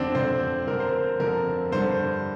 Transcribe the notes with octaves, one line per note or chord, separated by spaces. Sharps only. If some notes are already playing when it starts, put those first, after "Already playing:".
Already playing: F2 D3 C4 D4
F2 D3 C5
F2 D3 A#4
C5
A#4
F2 D3 A#4
G2 D3 C5